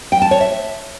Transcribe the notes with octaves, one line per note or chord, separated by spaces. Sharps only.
G5
A5
C#5
E5